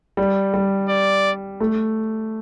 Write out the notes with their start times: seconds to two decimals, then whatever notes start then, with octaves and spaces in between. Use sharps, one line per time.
0.17 G3
0.54 G3
0.89 D5
1.60 A3